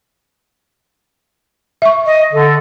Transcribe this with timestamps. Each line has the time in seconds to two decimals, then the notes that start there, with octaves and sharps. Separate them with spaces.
1.82 E5 C#6
2.06 D#5
2.33 D3 A4